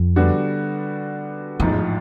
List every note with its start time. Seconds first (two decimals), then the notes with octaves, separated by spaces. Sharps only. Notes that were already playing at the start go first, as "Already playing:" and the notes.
Already playing: F2
0.16 D3 G3 B3 D4 F#4
1.60 A1 F2 G#2 F3
1.69 E2